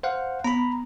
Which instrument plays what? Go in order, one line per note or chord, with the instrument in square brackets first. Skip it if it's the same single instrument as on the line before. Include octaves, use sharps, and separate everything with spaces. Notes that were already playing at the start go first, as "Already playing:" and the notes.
[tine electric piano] C5 F5 F#5
[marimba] B3 [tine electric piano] A#5 B5